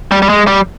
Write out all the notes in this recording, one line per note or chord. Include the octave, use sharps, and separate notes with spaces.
G3
G3
G#3
G3